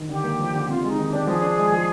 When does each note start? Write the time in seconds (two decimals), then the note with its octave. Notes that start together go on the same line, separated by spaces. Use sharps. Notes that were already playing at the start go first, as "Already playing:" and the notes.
Already playing: D#3
0.09 D3 G4
0.24 A#3
0.39 F3
0.54 D3
0.68 C3 F4
0.83 G#3
0.88 D#4
0.98 D#3
1.08 G4
1.13 D4
1.27 F3 G#4
1.42 D4
1.57 G#3
1.72 F3